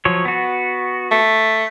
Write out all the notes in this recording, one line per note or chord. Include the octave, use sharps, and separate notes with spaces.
F3 F#3 C#5
B3 F#4
A3